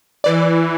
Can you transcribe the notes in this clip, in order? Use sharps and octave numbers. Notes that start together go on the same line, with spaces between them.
E3 D5